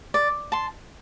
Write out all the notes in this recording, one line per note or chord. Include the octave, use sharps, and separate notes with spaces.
D5
A5 C6